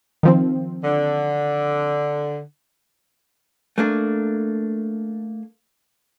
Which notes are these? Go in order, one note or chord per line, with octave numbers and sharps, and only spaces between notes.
D#3 F3 C4
D3
A3 A#3 D4